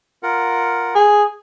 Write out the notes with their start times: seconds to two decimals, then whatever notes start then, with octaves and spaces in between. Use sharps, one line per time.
0.23 F4 A#4 F#5
0.95 G#4